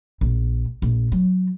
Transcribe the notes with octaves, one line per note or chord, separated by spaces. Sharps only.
A#1
A#1
F#3